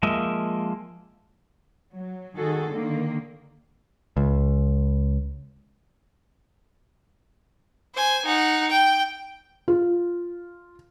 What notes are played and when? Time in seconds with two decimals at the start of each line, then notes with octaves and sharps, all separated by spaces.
0.03 F3 G#3 A#3 D#5 E5
1.95 F#3
2.37 D#3 F#4 G#4 A4
2.71 D3 D#3 A#3
4.17 C#2
7.95 C5 G#5
8.26 D#4 F#5
8.70 G5
9.68 F4